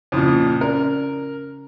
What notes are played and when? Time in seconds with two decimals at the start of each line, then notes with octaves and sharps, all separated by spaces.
0.12 F2 A#2 C#3 C#4 E4
0.61 C#4 A#4 D5